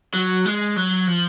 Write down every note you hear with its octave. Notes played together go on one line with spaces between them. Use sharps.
F#3
G#3
F#3
F3